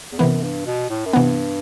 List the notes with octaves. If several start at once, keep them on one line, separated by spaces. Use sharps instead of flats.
E2
F#2 C3 E3 B3
G2
B2
A2
F#2
G2 C3 E3 B3